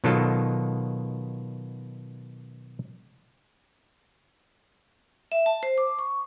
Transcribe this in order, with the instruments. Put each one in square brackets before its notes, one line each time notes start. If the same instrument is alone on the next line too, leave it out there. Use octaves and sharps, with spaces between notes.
[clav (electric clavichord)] B2 D#3 F#3 F4 A4
[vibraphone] E5
A5
C5
D6
C#6